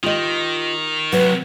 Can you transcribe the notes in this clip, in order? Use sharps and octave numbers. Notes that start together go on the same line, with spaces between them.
D#3 F4 G4 D#5
D2 C3 F#3 B4